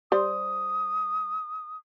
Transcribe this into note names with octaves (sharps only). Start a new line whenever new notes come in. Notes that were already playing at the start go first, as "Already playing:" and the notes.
G3 C5 D#6